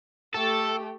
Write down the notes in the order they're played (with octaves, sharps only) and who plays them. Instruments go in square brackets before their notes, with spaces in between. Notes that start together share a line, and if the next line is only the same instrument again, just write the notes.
[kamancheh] A3 G4 [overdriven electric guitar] A4